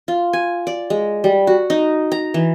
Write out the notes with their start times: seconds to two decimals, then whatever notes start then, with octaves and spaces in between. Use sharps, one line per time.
0.08 F4
0.33 G#5
0.67 D5
0.90 G#3
1.24 G3
1.47 F#4
1.70 D#4
2.12 A#5
2.34 E3